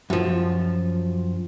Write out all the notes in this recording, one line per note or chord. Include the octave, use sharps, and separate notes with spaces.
F#2 F3